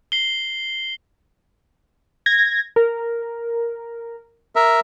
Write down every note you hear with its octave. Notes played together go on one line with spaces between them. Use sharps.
C7 G7
G#6 A#6
A#4
A#4 E5